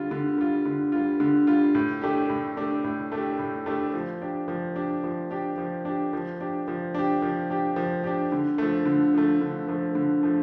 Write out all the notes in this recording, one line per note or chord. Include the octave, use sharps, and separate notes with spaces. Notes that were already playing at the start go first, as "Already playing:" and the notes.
Already playing: D3 G3 F4
D3
G3 F4
D3
G3 F4
D3
G3 F4
A2
A3 D4 G4
A2
A3 D4 G4
A2
A3 D4 G4
A2
A3 D4 G4
F3
D4 G4
F3
D4 G4
F3
D4 G4
F3
D4 G4
F3
D4 G4
F3
D4 G4
F3
D4 G4
F3
D4 G4
D3
F3 A3
D3
F3 A3
D3
F3 A3
D3
F3 A3